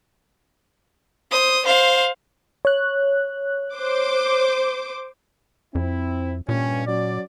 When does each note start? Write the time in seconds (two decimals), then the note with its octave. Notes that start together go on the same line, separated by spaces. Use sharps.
1.32 C5 D#6
1.66 C5 F5
2.65 C#5 F#6
3.75 C5 D6
5.75 F2 C4 E4
6.49 G2 A#2 C#4
6.86 F#3 C#4 D5